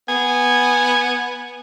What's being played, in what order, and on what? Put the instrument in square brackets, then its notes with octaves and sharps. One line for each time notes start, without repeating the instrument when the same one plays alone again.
[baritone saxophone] B3 [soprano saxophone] G#5